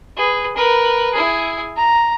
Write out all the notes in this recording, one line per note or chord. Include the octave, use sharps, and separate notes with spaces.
G#4 B4
A#4 B4
E4 G#4
A#5